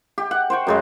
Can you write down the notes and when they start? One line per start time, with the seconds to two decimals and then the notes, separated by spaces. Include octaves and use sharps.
0.18 G4
0.31 F#5
0.50 C5 G5 C#6
0.67 F#2 C#3 G#3